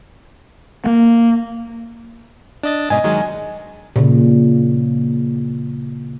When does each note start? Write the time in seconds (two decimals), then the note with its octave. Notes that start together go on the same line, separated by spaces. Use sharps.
0.86 A#3
2.63 D4 D#5 A6
2.90 G#2 B2 D#5 G#5
3.04 D#3 F#3 G#3
3.96 A#2 C#3